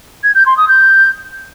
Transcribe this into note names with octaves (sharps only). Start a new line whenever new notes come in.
G#6
G6
C6
D#6
G6